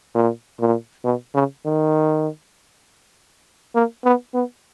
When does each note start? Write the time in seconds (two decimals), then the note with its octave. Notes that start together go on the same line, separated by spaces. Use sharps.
0.15 A#2
0.60 A#2
1.05 B2
1.35 C#3
1.65 D#3
3.75 A#3
4.05 B3
4.34 B3